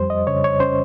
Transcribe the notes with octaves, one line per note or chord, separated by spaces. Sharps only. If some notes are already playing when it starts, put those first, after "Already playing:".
Already playing: F2 G3 C5
D#5
C#3 C#5
C#5
C#4 C5